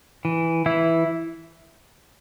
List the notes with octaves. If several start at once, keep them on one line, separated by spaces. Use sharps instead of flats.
E3
E3 E4